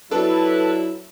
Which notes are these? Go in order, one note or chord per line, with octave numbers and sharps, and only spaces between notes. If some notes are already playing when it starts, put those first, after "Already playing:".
F#3 D4 E4 F#4 A4 B4